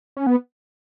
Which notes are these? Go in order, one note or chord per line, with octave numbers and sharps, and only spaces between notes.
C#4
B3